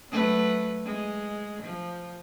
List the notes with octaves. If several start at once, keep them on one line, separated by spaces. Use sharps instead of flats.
F#3 A3 B4
G#3
F3